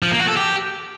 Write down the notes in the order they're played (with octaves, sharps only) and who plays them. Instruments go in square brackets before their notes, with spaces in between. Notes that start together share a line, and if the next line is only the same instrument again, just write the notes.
[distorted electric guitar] F3
A#3
F#4
A4
G4